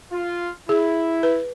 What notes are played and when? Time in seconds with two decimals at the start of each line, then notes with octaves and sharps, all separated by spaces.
0.12 F4
0.69 E4 G#4
1.23 B4